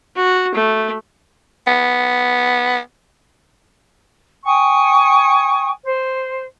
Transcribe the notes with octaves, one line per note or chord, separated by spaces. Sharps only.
F#4
A3
B3
G5 G#5 C#6 D#6
C5